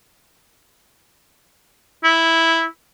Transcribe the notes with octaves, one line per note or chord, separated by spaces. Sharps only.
E4